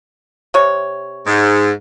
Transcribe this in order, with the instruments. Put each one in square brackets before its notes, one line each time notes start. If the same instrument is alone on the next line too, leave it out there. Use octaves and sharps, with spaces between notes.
[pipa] C3 C#5
[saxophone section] G#2